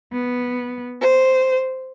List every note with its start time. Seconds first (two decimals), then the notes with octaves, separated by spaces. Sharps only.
0.12 B3
1.01 C5